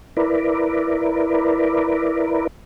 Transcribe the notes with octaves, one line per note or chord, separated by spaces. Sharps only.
E4 A#4 B4 D5